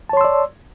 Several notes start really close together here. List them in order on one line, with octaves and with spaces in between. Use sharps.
A5 C#5 C6 E6 D5